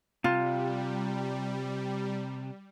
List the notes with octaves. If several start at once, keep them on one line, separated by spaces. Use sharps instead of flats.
C3 G3 F4